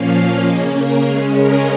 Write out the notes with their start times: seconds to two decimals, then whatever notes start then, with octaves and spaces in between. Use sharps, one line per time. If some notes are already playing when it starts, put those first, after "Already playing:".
Already playing: A#2 F3 A#3 C#4 F5
0.47 C#3 A#3 C#4 D#5
0.77 A#4
1.07 C#3 G#3 C#4 G#4
1.37 A#4